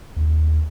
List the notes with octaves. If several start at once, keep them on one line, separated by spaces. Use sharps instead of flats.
D#2